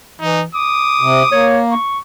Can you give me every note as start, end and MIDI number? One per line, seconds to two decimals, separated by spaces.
0.20 0.45 52
0.20 0.42 63
0.55 1.30 86
0.55 1.50 87
1.01 1.23 48
1.32 1.74 58
1.32 1.60 73
1.71 1.99 85